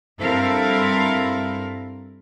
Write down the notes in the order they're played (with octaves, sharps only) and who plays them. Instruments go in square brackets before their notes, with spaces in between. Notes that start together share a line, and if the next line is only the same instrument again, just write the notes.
[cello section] G2 C4 E4 A4 A#4 F5